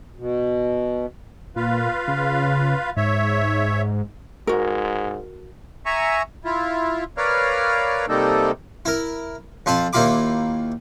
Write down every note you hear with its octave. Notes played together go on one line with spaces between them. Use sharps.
B2
A#2 F4 B4 F5
C#3
G#2 C#5 E5
G#2 F#4 A#4
E5 G#5 A#5 C#6
E4 F4
A#4 B4 C#5 D5 F5 F6
C3 G3 A#3 D#4 A4
E4 A#4
F2 F4 A5 B5
D#2 A#3 E4 F4 B5 D6